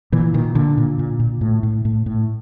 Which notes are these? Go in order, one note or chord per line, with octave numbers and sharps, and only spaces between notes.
A#2 E3
A#2 D#3
A#2 D3
A#2
A#2
A#2
A2
A2
A2
A2